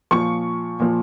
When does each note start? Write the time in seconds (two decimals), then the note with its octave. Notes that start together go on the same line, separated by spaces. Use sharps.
0.11 A#2 F3 C#6
0.79 A#2 F3